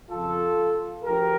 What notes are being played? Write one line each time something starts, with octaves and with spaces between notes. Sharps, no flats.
F2 C#3 F3 F4 A4
D2 D3 F3 G4 A#4